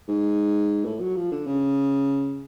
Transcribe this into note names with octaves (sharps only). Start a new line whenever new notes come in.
G#2
A2
F#3
F3
D3
C#3